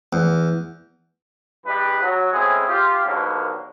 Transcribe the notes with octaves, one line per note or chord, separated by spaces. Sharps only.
E2
G2 E3 G3 G#3 B4
F#3
G#3 A3 C4 C#4 E4 G#4
F4 G4
D#2 G#2 B2 D3 F#3 A#3